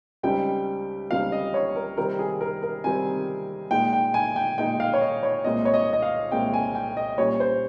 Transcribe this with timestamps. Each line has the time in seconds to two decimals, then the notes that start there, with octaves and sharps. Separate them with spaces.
0.23 C#2 C#3 G3 C4 D#4 G5
1.10 C#2 C#3 G3 C4 D#4 F5
1.32 D#5
1.54 C#5
1.76 A#4
1.97 C3 D#3 G3 C4 A#4
2.19 G#4
2.41 A#4
2.63 A#4
2.84 C3 D#3 G3 C4 G#5
3.71 A#2 G#3 D#4 G5
3.93 G5
4.14 G#5
4.36 G5
4.58 A#2 G#3 D#4 G5
4.80 F5
4.94 C#5
5.01 D#5
5.23 C#5
5.44 C2 A#2 G#3 C4 D#5
5.65 C#5
5.74 D#5
5.93 D#5
6.02 F5
6.32 C2 A#2 G#3 C4 G5
6.54 G#5
6.75 G5
6.97 D#5
7.18 A#2 G3 C#4 C#5
7.40 C5